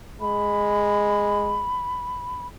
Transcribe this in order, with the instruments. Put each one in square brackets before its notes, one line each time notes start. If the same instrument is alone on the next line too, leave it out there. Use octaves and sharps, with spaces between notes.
[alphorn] G#3 [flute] B5